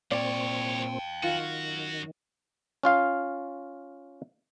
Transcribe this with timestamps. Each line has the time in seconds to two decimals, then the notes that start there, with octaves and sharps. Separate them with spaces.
0.11 C2 A#2 C4 C#5 D5 F5 G5
1.23 F#2 D#3 F4 F#4
2.83 C#4 F4 F5